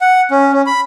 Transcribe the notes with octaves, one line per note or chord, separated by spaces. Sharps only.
F#5
C#4
C#4
B5